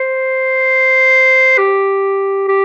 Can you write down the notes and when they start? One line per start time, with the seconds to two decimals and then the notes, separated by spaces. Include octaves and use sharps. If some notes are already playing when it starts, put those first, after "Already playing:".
Already playing: C5
1.58 G4
2.48 G4